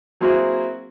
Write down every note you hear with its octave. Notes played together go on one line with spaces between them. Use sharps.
F#3 A#3 C4 E4 F#4 G#4